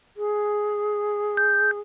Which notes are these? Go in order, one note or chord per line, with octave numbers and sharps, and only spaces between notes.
G#4
G6